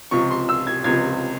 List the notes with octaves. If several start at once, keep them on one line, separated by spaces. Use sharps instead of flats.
C#2 C3 F3 C#6
C6
E6
G#6
C#2 C3 F3 G#6